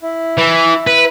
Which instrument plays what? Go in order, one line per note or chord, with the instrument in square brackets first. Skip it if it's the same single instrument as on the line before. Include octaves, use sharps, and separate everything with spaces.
[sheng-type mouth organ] E4
[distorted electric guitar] E3
B4